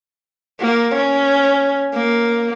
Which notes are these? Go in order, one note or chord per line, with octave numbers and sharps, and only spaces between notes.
A#3
C#4
A#3